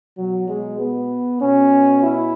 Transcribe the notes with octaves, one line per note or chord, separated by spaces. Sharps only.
B2 F#3
G#3
B3
B2 C#4
E4